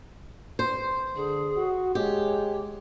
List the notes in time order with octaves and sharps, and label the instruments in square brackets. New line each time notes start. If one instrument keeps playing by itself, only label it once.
[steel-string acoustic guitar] C5
[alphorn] D3 [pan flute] G#4
[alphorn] F#4
[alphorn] G#3 [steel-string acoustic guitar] G4 [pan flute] C#5